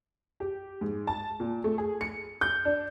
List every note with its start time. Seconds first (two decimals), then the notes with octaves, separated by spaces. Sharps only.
0.40 G4
0.81 G#2
1.07 A5
1.40 A#2
1.64 A3
1.78 G#4
2.01 C#7
2.41 G6
2.65 D4